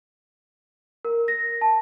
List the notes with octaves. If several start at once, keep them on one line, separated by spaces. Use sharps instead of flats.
A#4
A#6
A5